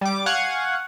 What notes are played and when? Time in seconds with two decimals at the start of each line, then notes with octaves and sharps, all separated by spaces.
0.01 G3 D6
0.26 F5 F#5 G#5 C#6 F#6 G#6